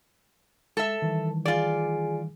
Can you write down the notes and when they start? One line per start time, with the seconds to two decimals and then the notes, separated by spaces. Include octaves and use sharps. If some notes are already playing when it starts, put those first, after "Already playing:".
0.77 G#3 A4 E5 A5
1.02 D#3 E3 G3
1.45 F4 G#4 D5 G#5